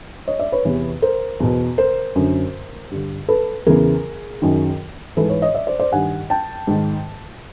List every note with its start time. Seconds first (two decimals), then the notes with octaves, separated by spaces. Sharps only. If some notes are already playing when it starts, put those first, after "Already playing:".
0.28 C#5 D#5
0.39 D5 E5
0.52 B4 C#5
0.65 E2 C3 E3
1.02 A#4 C5
1.40 E2 B2
1.78 A#4 C5
2.16 F#2 D3
2.91 G2 D3
3.29 A4 B4
3.66 E2 C#3 E3 G#4 A#4
4.42 F#2 D#3
5.17 G#2 E3 A4 B4
5.30 B4 C#5
5.42 C#5 D#5
5.55 D5 E5
5.67 C5 D5
5.79 C5 D5
5.92 G2 D#3 F#5 G#5
6.30 G5 A5
6.67 G#2 D#3